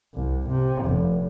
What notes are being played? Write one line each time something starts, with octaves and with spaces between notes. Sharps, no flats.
C2
C3
F1